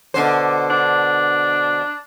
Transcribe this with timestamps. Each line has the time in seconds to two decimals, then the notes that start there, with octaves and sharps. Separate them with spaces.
0.14 B2 D3 C5
0.70 D4